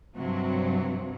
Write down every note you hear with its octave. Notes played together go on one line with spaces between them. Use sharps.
G2 C3 F#3